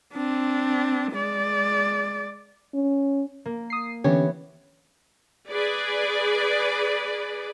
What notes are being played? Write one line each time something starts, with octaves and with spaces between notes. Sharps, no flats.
C4 D4
G#3 D5
C#4
A#3
D#6 C7
D3 E3 B3 C#4 G4 C#5
G#4 B4 D5